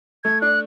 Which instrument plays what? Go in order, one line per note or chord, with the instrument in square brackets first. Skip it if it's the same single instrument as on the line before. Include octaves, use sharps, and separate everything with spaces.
[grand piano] A3 [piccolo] G#6
[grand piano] D4 [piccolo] F#6